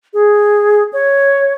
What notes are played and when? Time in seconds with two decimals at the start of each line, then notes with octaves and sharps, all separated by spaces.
0.14 G#4
0.93 C#5